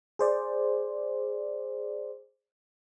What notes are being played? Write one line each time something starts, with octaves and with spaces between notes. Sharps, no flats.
G#4 C5 D5